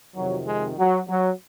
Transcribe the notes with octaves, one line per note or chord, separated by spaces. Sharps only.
F2 C3 D#3 F#3
G#3
F#3
F#3